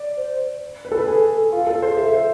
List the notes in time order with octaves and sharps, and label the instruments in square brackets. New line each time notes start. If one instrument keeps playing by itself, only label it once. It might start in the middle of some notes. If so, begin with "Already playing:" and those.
Already playing: [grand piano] D5
[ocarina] C5
[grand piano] B4
A4
B4
[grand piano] G#4 [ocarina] A4
[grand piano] F4
A4
C5
[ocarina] G#4
[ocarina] A4 [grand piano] E5
[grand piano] C5